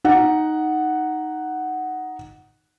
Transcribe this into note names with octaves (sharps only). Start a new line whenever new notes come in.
D#4 F#5